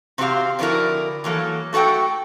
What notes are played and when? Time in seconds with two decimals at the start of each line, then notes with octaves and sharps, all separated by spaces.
0.18 C3 C4 D4 F#4 G4 F5
0.59 F2 D3 D4 E4 F#4 A#4
1.24 E3 F#3 A#3 A4
1.73 A3 F#4 A4 F#5 G5